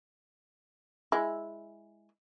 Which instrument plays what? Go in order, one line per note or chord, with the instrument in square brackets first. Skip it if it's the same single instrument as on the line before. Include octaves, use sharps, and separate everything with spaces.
[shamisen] G#3 E4